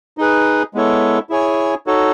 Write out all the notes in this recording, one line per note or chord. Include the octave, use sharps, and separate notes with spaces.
D#4 G#4 B4
G#3 B3 E4 A4 C#5
E4 G#4 C#5 G#5
D#4 F#4 A4 C#5